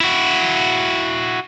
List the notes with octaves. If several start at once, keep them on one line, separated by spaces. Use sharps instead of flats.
E4 F#4